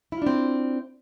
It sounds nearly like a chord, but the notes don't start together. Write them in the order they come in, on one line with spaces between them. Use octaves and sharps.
E4 F4 D4 C4